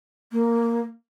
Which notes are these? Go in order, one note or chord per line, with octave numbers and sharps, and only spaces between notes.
A#3